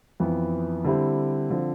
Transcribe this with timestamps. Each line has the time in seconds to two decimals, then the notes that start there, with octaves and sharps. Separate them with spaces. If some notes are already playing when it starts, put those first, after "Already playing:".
0.20 F2 E3 B3
0.85 D3 G3 C4 E4 G4
1.50 D3 F3 C4